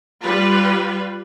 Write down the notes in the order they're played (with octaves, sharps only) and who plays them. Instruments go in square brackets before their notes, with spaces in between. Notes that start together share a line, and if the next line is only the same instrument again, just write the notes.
[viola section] G3 F4 B4